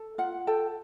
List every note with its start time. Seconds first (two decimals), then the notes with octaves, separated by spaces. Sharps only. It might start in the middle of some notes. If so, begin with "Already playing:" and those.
Already playing: A4
0.18 F4 F#5
0.47 A4 G5